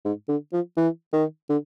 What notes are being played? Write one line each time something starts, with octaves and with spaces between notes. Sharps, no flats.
G#2
D3
F3
E3
D#3
D3